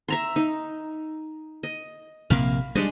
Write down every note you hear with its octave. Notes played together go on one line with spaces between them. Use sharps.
E5 A#5 C6
D#4
D#5
A#1 C3 A#3 F5 B5
G3 G#3 D4 D#5